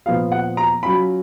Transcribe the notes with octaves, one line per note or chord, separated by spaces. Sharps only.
A#2 F3 B3 F4 F5
F#5
A#5
F#3 C#4 F4 B5